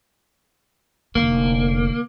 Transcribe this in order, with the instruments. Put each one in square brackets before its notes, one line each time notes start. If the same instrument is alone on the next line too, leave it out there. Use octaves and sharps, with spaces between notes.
[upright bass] F1 D3 [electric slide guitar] A#3